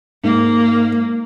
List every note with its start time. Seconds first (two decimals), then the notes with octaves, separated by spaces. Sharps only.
0.23 G#2 A#3